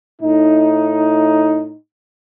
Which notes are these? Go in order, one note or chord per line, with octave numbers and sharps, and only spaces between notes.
A2 D#4